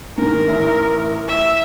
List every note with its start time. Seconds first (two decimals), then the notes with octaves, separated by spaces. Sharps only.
0.18 G#2 D#3 A#4
0.48 A1 E5
1.28 E5